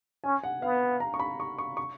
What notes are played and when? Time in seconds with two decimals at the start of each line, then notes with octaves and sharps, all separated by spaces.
0.24 C#4 G#5
0.44 F#5
0.62 B3 F5
1.00 A#5
1.14 C#6
1.20 B5
1.40 C#6
1.58 C#6
1.77 C#6